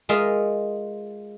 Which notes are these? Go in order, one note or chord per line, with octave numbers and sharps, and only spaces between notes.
G#3 F4 A#4 D#5 E5